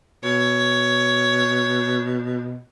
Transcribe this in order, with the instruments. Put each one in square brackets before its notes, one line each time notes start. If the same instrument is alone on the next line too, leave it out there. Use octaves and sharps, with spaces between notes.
[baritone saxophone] B2 [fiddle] C#5